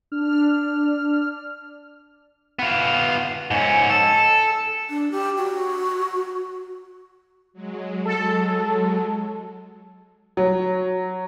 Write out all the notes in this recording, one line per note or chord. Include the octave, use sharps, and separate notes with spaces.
D4 F6
B3 F4
G#2 C#4
A4
D4
G4
F#4
F#3 G#3
A4
F#3